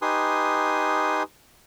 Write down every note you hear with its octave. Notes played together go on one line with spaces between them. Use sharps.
D#4 G4 B4 G#5 C6 D#6